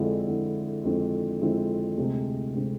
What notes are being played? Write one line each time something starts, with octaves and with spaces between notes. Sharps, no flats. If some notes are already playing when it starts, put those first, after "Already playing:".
Already playing: F2 D3 G#3 C4 E4
F2 D3 G#3 C4 E4
F2 D3 G#3 C4 E4
F2 D3 G#3 C4 E4
D2 C3 G#3 C4
C3 G#3 C4